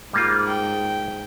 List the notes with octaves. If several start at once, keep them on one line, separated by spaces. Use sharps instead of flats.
G#2 G3 A#3 F4
G5